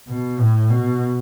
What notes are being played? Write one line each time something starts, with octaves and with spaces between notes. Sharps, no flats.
B2
A2
B2